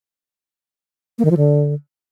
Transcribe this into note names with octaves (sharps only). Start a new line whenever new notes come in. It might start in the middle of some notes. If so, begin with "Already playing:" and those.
A#3
D#3
F3
D3